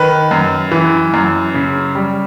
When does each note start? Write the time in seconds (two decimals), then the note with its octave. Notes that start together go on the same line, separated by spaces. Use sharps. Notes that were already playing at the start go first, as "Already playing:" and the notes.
Already playing: D#3 B4
0.31 F#2
0.72 E3
1.14 F#2
1.54 C#3
1.95 G3